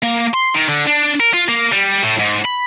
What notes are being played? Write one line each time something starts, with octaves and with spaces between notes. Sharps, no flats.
A#3
C6
D#3
D3
D4
A#4
F4
A#3
G3
A2
G#2
B5